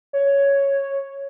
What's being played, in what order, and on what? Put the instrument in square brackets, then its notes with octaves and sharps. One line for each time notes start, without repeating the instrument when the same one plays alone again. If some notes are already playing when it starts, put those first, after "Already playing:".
[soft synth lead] C#5